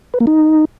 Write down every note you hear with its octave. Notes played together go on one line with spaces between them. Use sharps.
B4
A#3
D#4